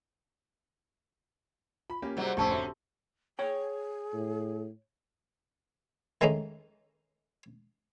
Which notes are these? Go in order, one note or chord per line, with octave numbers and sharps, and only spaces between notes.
F4 B5
A#3 C#4 G4
G#2 C3 F#3 G3
F1 A2 C3 C#4 G4 A5 C#6 E6
D3 C4 F#4 G4 E5
G#4 C#5 G5
A2
D#3 G#3 A3 C#4 D#4